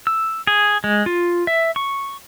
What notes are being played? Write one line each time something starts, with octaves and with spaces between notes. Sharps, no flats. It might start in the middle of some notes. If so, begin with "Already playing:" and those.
E6
G#4
G#3
F4
E5
C#6